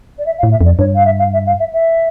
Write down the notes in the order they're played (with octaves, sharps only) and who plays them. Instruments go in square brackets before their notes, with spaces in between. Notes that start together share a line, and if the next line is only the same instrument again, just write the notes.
[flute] D5
E5
F5
[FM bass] A2
[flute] E5
[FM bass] F2 [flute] D5
[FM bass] G2 [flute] C#5
[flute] F5
E5
F5
E5
F5
E5
E5